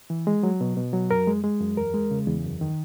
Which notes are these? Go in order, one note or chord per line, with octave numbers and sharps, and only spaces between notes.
E3
G#3
F#3
B2
B2
F#3
F#2 A#4
G#3
G#3
F#2
E2 A#4
G#3
C#3
E2
F#2
D#3